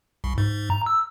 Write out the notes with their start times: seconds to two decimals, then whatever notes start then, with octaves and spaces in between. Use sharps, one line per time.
0.24 C2
0.38 G#2
0.70 A#5
0.86 E6